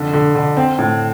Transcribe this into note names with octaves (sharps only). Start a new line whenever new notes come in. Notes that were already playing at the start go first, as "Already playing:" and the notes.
Already playing: F2 D3
D3
D3
C4
A2